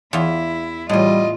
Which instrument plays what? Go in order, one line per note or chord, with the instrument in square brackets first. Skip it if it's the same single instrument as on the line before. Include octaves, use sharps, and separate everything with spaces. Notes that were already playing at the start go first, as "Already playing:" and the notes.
[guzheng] E2 F4 [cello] E4
[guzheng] E2 A2 [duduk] G3 [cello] F4 [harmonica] D#5